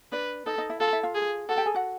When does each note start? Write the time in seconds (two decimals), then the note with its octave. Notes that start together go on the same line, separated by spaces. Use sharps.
0.12 D4 B4 D5
0.46 D#4 A4 D#5
0.58 D#4 D#5
0.70 E4 E5
0.80 F4 A4 F5
0.93 E4 E5
1.03 F4 F5
1.15 G#4
1.49 F#4 A4 F#5
1.58 G4 G5
1.66 G#4 G#5
1.74 F#4 F#5